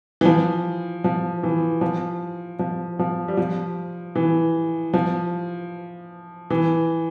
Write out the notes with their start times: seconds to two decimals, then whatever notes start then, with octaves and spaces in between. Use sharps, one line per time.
0.21 E3
0.25 F3
1.04 F3
1.43 E3
1.81 F3
2.59 F3
2.99 F3
3.28 G3
3.37 F3
4.15 E3
4.94 F3
6.50 E3